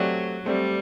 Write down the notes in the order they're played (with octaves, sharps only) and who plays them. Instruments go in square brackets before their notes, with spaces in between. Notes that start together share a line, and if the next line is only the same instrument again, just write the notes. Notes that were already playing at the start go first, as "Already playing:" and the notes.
Already playing: [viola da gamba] F#3 [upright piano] A3 C4 G4 D5
[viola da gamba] G3 [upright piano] A3 C4 G4 D5